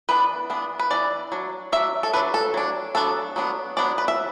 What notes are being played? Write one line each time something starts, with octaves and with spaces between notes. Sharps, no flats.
E3 B3 D4 B4
E3 B3 D4
B4
E3 B3 D4 D5
F#3 D4
F#3 D4 E5
A4
F#3 D4 B4
A4
F#3 D4
F#3 B3 D4 A4
F#3 B3 D4
F#3 B3 D4 D5
B4
E5